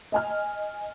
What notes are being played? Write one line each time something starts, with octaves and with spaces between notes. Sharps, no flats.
D#5 G#5 F6